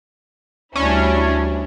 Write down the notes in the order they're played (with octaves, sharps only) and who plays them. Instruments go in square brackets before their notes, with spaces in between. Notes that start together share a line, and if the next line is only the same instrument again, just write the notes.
[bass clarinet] D2 [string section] G3 D4 E4 [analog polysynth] C#4